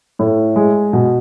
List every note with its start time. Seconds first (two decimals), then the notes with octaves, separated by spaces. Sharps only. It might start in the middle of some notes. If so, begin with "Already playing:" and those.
0.19 A2
0.56 G#3
0.93 B2